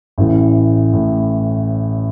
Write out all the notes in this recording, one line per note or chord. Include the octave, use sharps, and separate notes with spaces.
A1 A2 E3
A2